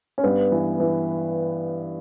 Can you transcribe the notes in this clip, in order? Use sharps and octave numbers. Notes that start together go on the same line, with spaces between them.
C#4
G2 B3
E3
E3